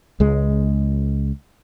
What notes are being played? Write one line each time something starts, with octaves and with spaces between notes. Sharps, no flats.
C#2 G#3